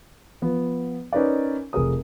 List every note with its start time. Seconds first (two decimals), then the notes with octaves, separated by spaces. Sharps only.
0.42 F3 B3
1.12 C#4 D#4 A#4 B4 D5
1.73 F1 G#4 A#4 D#6